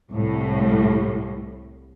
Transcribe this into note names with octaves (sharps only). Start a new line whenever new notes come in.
C2 A2